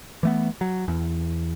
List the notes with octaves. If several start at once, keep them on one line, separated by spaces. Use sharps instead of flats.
E3 A3 B3
F#3
E2